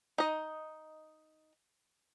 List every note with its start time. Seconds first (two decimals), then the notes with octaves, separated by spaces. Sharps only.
0.18 D#4 D#5